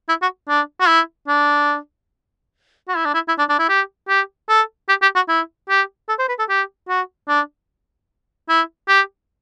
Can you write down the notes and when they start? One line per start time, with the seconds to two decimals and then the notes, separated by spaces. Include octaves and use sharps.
0.09 E4
0.22 F#4
0.49 D4
0.80 F#4
0.88 E4
1.28 D4
2.89 F#4
2.97 E4
3.05 D4
3.14 E4
3.28 E4
3.38 D4
3.49 D4
3.59 E4
3.69 G4
4.08 G4
4.49 A4
4.89 G4
5.02 G4
5.15 F#4
5.28 E4
5.69 G4
6.09 A4
6.19 C5
6.29 B4
6.39 A4
6.49 G4
6.89 F#4
7.28 D4
8.49 E4
8.88 G4